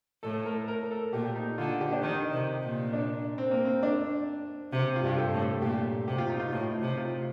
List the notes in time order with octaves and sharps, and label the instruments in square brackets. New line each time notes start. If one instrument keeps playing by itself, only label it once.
[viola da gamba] A2 [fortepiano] A4
[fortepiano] A#4
A#4
A4
[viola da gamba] A#2 [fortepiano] G4
[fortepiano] D#4
[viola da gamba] D3 [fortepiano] F4
[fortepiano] G4
D4
[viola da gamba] D#3 [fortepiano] D#4
[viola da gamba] C3
A#2
[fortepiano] D4
C4
A#3
C4
D4
[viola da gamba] C3 [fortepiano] G4
[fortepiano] F4
[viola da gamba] G2
[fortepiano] G4
A4
[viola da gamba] A2
[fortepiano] A4
[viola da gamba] A#2 [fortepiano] G4
[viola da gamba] C3 [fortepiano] G4
[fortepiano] F4
D#4
F4
[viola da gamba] A2 [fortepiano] F4
[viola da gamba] C3
[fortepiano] F4